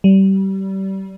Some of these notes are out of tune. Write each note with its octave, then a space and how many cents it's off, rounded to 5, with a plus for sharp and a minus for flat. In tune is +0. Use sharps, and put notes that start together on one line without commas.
G3 -25